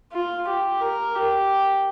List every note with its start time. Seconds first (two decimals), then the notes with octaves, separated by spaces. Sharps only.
0.12 F4
0.48 G4
0.81 A#4
1.15 G4